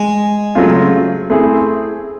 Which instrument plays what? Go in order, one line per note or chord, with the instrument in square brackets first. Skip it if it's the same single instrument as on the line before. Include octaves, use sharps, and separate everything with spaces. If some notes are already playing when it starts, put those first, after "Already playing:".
Already playing: [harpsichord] G#3
[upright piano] C#3 F#3 A3 C4 F4
A3 C4 E4 G#4